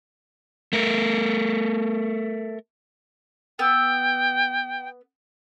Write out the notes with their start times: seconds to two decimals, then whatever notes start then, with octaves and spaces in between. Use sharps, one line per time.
0.73 A3 A#4
3.59 B3 G5 E6